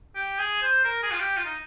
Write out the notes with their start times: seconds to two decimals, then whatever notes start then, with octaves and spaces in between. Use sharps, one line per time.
0.15 G4
0.39 G#4
0.62 C5
0.84 A#4
1.03 G#4
1.11 F4
1.20 G4
1.37 F4
1.46 D#4